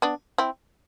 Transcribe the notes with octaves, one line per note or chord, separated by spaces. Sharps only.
B3 D4
C4 E4